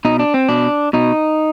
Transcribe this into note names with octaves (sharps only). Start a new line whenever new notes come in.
B2 D#4
D4
C4
B2 D4
B2 D#4